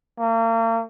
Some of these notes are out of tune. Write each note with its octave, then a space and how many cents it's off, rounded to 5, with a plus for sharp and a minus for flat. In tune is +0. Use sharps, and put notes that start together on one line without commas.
A#3 -40